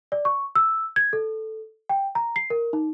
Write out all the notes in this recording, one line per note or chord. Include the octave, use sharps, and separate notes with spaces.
D5
C#6
E6
G#6
A4
G5
A#5
C7
A#4
D#4